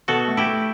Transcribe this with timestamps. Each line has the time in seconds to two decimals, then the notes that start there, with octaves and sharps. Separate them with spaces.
0.08 B2 F#4 A4
0.28 A3
0.37 E4 G4
0.47 A3